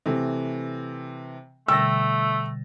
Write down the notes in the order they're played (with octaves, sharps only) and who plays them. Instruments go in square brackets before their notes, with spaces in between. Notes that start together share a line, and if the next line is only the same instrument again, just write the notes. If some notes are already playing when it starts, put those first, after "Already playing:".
[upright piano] C3 E3 A3
[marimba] B2 D3 G3 [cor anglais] A3 [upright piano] G5 A6 A#6 [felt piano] E6